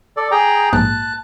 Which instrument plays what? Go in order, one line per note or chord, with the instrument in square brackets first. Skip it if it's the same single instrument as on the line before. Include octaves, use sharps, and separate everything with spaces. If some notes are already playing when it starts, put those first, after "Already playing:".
[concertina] A4 D5
G#4 G5 A#5
[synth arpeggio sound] A#1 G#2 [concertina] A5 F#6